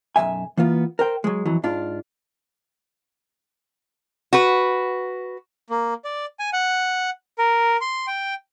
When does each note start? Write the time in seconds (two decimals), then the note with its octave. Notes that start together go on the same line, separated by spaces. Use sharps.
0.16 B1 F#2 D#3 E5 G#5
0.57 E3 A#3 B3 F4
0.99 A#4 C5 G5
1.24 F#3 G#3
1.46 F2 E3 F#3
1.63 G#2 D4 F4
4.33 F#4 B4
5.70 A#3
6.05 D5
6.39 G#5
6.53 F#5
7.38 A#4
7.81 C6
8.07 G5